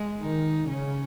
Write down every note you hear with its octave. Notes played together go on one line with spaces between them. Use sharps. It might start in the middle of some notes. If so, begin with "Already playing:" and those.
Already playing: G#3
D#3 D#4
C#3 C#4